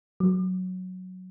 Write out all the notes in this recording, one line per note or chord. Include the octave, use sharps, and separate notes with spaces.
F#3